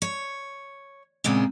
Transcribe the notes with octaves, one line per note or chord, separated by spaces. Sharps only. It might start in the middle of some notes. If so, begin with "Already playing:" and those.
C#5
A#2 C#3 G#3 B3 C4